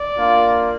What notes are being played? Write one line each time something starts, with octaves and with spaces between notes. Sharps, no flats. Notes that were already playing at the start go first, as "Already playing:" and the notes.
Already playing: D5
A#3 D4 F4